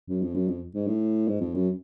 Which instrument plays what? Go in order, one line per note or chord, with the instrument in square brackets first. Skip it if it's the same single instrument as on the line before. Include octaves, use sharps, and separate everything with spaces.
[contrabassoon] F#2
F2
F#2
F2
G#2
A2
G#2
F2
F#2